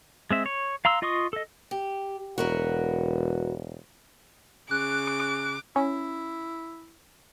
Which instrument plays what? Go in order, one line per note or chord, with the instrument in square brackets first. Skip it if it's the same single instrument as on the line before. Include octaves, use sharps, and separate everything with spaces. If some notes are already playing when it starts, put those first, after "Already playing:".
[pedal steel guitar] G#3 C4 E5
C#5
F5 A#5 C6 E6
F4 D#5 C6 C#6 D#6
A4 D#5
[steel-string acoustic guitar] G4
[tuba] E1 [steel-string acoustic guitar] F#4 A#4 B4
[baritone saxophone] C#3 [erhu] D6 [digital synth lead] F#6
[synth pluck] C#4 [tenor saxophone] E4